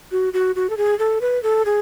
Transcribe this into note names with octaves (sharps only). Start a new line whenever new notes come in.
F#4
F#4
F#4
A4
G#4
A4
B4
A4
G#4